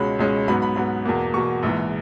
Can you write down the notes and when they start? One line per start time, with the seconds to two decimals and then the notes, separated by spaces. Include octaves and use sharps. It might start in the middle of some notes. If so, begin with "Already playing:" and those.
Already playing: C#2 B2 G#3 C#4 B5
0.19 C#2 B2 G#3 C#4
0.48 G#2 F#3 B3 B5
0.62 B5
0.76 G#2 F#3 B3
1.05 E2 B2 A#3
1.34 E2 B2 A#3 C#6
1.63 A#1 G#2 E3